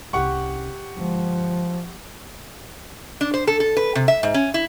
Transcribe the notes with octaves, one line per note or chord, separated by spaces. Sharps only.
C2 C#4 G4 F#5 C#6
G1 F3 G#3
D4
C5
A4
A4
B4
C3
E5
G#2
C#4
E4